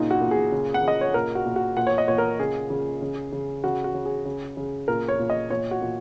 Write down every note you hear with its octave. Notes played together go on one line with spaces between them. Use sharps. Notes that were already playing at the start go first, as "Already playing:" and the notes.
Already playing: A#2 C#3 D#4
F#4
A#2
G#4
C#3
F#5
C#3 D#5
C#5
A#2 A#4
F#4
A#2
F#4
A#2 F#5
C#5
D#5
A#2 C#5
A#4
C#3 G#4
C#3
C#3
C#3
C#3 F#4
F#4
C#3
G#4
C#3
C#3
A#2 A#4
C#5
A#2
D#5
A#2 C#5
F#4
A#2